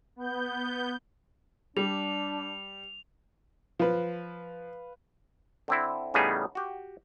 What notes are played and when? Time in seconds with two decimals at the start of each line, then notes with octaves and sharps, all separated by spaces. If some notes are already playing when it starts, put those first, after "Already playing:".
0.16 B3 G6
1.77 G3 D4 F7
3.80 F3 B4 F5
5.68 D3 C4 E4
6.14 A2 C#3 G3 B3 D#4 G#4
6.55 F#4 G4